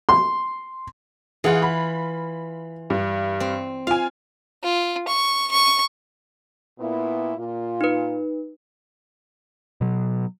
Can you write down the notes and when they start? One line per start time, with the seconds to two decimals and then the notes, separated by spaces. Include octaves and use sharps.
0.09 C6
1.44 E3 F4 G#4 F#5
1.62 B5
2.90 G2
3.40 C4
3.87 F4 F5 G#5
4.63 F4
5.08 C#6
5.51 C#6
6.79 A#2 B3 E4
7.38 A#2 F4
7.81 D#4 B4
9.81 B2 F#3